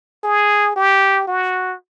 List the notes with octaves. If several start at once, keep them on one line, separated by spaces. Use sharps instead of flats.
G#4
G4
F#4